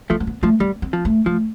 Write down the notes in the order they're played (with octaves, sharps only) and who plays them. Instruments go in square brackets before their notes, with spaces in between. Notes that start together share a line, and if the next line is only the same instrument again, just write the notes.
[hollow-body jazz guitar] F3 A3 [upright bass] B3
[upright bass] A3
B3
[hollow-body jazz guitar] F3 [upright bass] A3
[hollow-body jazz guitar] G3 [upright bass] B3
[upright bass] C4
[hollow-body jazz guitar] F3
[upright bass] A3
[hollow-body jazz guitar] F3 [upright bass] A3